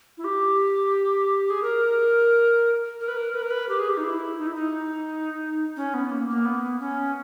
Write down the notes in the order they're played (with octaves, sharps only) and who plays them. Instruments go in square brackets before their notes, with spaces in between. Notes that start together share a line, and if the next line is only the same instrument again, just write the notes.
[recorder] E4
G4
G#4
A#4
A#4
B4
A#4
B4
A#4
B4
G4
G#4
G4
D#4
E4
D#4
E4
D#4
C#4
B3
A#3
A#3
B3
C#4